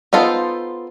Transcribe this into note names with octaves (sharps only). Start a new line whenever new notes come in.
B3 D#4 F4 A4 C5